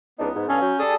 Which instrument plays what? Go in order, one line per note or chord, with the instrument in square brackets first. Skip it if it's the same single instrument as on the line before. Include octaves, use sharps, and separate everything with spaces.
[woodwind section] C#2 D4 D#4 [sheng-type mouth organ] B3
[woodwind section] G#2
[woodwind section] E2 G2 F5 [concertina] C#4 [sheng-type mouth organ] G#4 A4
[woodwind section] F#3 [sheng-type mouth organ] G6
[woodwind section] G3 D4 G#4 [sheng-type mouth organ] A4 A5 D#6